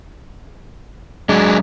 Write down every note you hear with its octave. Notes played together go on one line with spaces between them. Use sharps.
F#3 G#3 D4